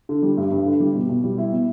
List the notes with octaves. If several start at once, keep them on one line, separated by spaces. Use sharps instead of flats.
D3
G3
G2
G2
D3
G3
B2
B2
G3
E4
B2